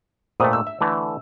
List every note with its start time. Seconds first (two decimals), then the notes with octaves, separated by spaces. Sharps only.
0.40 A#2 A3 C5 G5 D#6
0.53 E6
0.67 E5
0.81 D3 E3 A3